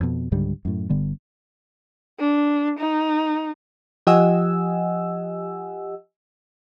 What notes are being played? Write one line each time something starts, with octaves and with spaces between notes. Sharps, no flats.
F2 B2
C#2 G#2 D3 G3
F#2 A2
G1 D3 G3 B3
D4
D#4
F3 G4 D#5 F#5 G#5 E6